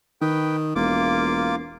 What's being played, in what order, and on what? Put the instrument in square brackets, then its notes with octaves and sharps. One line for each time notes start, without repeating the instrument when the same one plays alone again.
[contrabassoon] D#3 [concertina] B4 G5
[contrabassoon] E1 [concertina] A#3 F4 D6